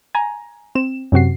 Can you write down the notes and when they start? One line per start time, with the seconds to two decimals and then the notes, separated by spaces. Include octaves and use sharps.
0.15 G#5 A#5
0.75 C4 E7
1.12 F#2 C3 F#4 C7